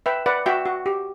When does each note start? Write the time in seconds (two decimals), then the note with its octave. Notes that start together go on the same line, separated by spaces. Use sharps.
0.06 B4 E5 G5
0.26 B4 D5 F#5
0.46 F#4 E5 G5
0.66 F#4
0.86 G4